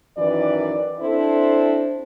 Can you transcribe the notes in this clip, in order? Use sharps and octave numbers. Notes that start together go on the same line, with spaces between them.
F#2 D#3 E3 B4 D5
C4 D4 E4 A4 C5